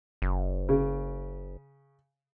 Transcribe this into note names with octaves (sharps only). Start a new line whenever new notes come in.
F#1
C#3